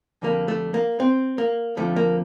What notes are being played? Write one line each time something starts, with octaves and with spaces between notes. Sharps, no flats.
F2 D3 G3 A#3
A3
A#3
C4
A#3
F2 D3 F3 A3
A#3